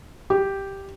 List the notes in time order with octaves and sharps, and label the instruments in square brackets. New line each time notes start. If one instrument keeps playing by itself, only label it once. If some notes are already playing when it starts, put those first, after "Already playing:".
[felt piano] G4